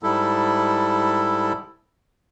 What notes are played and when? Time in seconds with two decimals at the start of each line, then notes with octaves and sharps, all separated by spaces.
0.03 G#2 G3 E4 A4